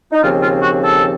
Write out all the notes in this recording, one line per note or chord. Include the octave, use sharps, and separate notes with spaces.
D#4
D#2 C#3 F3 C4 F4
F4
F#4
A4